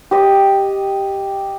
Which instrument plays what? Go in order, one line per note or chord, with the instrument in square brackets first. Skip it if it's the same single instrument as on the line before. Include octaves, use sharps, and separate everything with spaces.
[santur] G4 D#5